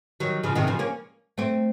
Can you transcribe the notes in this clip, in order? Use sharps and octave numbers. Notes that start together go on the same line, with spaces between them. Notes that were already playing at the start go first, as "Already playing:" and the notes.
D#3 F#3
C#3 F3
C3 D#3
C#3 F3
A#3 C#4
A3 C4